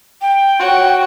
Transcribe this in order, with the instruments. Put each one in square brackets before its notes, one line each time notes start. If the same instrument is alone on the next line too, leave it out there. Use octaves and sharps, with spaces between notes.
[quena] G5
[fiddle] F#4 C#5